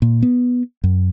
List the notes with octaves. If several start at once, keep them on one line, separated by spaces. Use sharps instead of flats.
A#2
B3
F#2